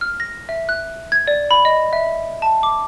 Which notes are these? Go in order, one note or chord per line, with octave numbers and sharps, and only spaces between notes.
F6
A#6
E5
F#6
G#6
D5
B5
D#5
E5
A5
D6